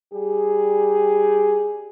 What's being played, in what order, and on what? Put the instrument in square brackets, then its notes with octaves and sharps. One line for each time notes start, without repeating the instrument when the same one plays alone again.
[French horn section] G3 G4 G#4